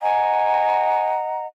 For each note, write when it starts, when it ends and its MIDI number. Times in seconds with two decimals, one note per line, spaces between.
0.02 1.47 75
0.02 1.47 78
0.02 1.11 80
0.02 1.47 82